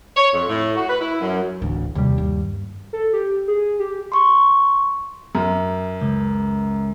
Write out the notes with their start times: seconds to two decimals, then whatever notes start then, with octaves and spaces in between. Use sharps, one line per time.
0.17 C#5
0.33 F2
0.48 A2
0.76 F#4
0.89 B4
1.01 E4
1.20 F#2
1.62 D1 A1 D2 D4
1.95 D#2 C3 G3
2.18 G2
2.93 A4
3.13 G4
3.48 G#4
3.79 G4
4.12 C6 C#6
5.35 F#2
6.01 C#2